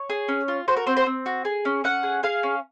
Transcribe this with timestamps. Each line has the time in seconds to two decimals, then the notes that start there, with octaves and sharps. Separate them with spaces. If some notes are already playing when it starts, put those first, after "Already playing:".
Already playing: C#5
0.10 G#4
0.28 C#4
0.48 F4
0.68 F#4 C5
0.77 A#4
0.87 C4 C5
0.97 C5
1.06 C4
1.26 F#4
1.45 G#4
1.65 C#4
1.84 C#4 F#5
2.03 G#4
2.23 G#4 F5
2.43 C#4